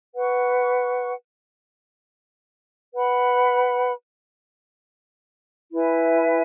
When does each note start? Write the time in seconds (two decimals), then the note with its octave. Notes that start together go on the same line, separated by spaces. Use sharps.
0.14 B4 F#5 C#6
2.94 B4 F#5 B5
5.73 E4 B4 E5 G#5